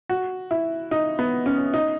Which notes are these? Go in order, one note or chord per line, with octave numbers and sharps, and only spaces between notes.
F#4
E4
D#4
B3
C#4
D#4